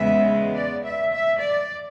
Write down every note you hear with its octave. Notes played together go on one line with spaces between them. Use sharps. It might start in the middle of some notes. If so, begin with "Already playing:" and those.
Already playing: E2 C#3 G#3 B3 E5
D5
E5
E5
D5